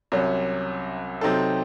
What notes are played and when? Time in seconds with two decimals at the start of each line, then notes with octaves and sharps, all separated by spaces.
0.12 C2 C3 F#3 C#4
1.21 C3 F#3 C4 D#4 A4